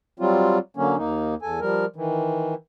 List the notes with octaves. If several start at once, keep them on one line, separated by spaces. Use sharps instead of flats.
F#3 G3 C4 F4
D3 F#3 A#3 C#4
D#2 A#3 D#4
E2 A4 G#5
F3 G3 A#4
D#3 E3